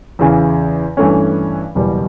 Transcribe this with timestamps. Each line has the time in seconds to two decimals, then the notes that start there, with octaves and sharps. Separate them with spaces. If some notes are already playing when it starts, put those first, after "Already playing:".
0.19 E2 C#3 E3
0.97 G2 E3 A3 C#4
1.75 F#1 E2 B2 G3